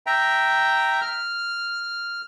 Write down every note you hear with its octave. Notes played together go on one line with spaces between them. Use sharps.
E5 G5 A#5
F6